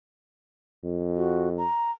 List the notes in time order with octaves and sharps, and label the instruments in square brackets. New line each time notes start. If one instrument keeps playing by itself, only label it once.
[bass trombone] F2
[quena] F#4
A#5